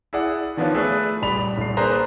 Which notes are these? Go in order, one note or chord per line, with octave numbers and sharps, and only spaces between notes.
E4 G#4 D5 F#5
D#3 F3 B3 D4 F4 C#5
A3 G#4 A4 B4 D5
D#1 G3 B5 F7
D#1 C7
A#3 D4 G#4 B4 C5 A#5